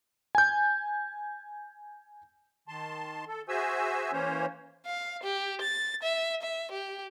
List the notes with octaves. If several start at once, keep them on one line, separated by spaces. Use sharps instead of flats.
G#5 G6
D#3 A5 C6
A4
F#4 G#4 C5 E5 G#5 E6
E3 A#3 C#4 C5 C#5
F5
G4
A6
E5
E5
G4